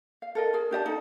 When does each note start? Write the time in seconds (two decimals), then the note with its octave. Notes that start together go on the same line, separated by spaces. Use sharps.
0.22 F5
0.35 A4 A#4 D#5
0.53 G#4 A#4
0.71 D4 G4 D#5 A5
0.86 D#4 A4